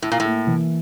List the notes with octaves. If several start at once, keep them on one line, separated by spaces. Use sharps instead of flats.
A2 E4
A#2
A2
A#3
E3